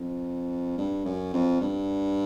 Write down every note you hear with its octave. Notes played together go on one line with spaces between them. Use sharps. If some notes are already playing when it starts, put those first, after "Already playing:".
Already playing: F2
G2
F#2
F2
G2